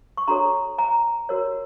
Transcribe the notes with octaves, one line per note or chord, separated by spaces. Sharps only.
C#6
D4 F#4 A4 C#5 A#5 C6
G#5 A#5
F#4 A#4 C#5